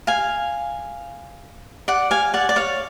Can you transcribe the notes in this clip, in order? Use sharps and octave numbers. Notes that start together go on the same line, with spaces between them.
F5 G#5
D5 F#5
F5 G#5
D5 F#5
D5
C#5 F5